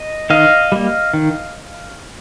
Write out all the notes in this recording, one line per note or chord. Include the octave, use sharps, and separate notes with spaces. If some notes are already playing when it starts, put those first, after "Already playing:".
Already playing: D#5
D#3 D#5 F5
G3 A#3
D#3